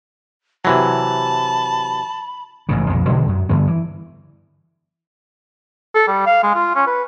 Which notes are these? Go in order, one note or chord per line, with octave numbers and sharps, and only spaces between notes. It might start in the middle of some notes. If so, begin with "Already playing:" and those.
C3 E3 F#3 A5 B5
A1 G#2 C#3
B1 F2 A#2
B2 D3 D#3 G#3
F#2
D2 G2 D3 B3
E3
A4
G3
F5
G#3
F4
C#4
B4